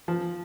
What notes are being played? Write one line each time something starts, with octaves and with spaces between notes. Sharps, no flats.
F3